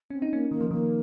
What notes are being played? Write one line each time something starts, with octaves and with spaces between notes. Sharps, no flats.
C4 C#4
D#4
A#3 C#4
D#3 A#3
F3
D#3 A#3